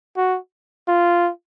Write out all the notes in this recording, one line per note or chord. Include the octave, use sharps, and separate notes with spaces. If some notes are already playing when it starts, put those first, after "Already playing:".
F#4
F4